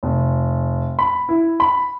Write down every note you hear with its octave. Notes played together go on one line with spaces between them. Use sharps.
F1
B5
E4
B5